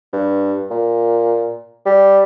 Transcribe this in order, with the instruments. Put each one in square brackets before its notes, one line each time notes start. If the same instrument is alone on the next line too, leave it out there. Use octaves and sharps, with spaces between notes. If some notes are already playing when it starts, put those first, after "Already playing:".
[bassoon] G2
A#2
G3